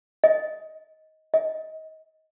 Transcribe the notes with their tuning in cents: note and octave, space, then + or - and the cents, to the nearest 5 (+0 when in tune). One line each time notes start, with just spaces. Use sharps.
D#5 +15
D#5 +25